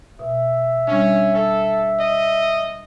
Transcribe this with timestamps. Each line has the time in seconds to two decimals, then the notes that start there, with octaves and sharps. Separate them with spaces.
0.19 B2 E5
0.88 G3 C#4 D4
1.35 A4
2.00 D#5